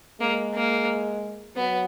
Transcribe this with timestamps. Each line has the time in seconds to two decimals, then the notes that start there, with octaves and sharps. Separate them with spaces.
0.20 G#3 A#3
0.55 A#3
1.56 F#3 B3